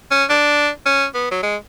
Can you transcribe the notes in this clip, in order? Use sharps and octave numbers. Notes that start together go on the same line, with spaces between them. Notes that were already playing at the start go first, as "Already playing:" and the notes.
C#4
D4
C#4
B3
F#3
G#3